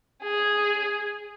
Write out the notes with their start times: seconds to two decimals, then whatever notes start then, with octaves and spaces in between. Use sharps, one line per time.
0.23 G#4